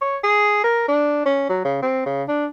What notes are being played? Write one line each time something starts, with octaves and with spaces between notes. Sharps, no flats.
C#5
G#4
A#4
D4
C#4
F#3
C#3
C4
C#3
D4